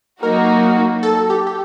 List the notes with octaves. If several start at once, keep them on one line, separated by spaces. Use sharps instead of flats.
F#3 A#3 D#4 F#4 A#4
A4
G4
G4